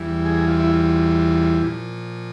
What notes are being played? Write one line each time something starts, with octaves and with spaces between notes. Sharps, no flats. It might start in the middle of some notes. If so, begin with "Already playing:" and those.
Already playing: E2 E3 G3
G#4
F4
E4
F4
A#2 F3